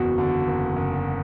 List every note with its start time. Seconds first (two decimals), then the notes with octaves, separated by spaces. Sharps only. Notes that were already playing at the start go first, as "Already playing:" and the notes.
Already playing: F#1 E2 F#4
0.18 D3
0.47 F#1
0.76 F#1